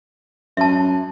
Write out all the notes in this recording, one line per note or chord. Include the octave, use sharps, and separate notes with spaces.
F#2 E5 A5